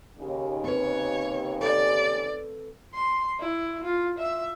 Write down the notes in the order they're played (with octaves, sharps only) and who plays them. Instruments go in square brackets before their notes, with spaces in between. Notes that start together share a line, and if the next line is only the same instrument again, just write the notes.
[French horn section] D#2 C#3
[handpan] C4 B4 [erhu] C#5
[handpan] A4 [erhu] D5
[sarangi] C6
E4
F4
E5